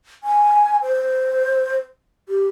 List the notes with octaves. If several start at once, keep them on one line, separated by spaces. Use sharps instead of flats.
G#5
C5
G4